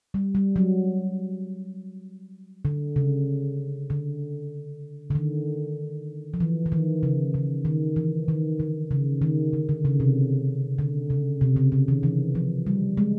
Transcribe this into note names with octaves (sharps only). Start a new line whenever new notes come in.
G3
G3
F#3
D3
C#3
D3
D3
D#3
F3
E3
E3
D#3
C#3
C#3
D#3
E3
D#3
D3
C#3
D#3
D3
D3
C#3
C3
D3
C#3
C3
C#3
C#3
D#3
E3
F3
G3
G#3